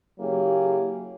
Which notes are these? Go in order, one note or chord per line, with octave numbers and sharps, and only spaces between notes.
C#3 F#3 A#3 E4 G4 G#4